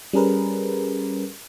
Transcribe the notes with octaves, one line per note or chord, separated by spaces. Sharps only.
G3 C#4 G#4 A#4 B4